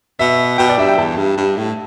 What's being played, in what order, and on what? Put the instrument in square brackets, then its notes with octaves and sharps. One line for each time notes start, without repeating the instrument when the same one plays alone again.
[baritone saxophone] B2 [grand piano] E5
[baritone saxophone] B2 [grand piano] G5
[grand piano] D5
[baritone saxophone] G2 [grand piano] E5
[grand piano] G5
[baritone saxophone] E2 [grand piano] A5
[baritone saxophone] G2
G2
A2